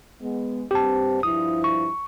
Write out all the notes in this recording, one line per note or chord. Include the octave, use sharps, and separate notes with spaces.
G#3 B3
G2 C4 G4 A5
G2 F3 E4 D#6
C#6